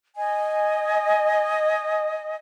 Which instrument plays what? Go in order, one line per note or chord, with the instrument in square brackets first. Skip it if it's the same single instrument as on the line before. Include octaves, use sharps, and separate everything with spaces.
[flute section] D#5 G#5